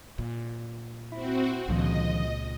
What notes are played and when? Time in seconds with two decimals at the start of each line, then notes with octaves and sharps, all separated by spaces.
0.18 A#2
1.12 C4 E4 F#4
1.68 C#2 A#2 D3 D#3 F3 D#5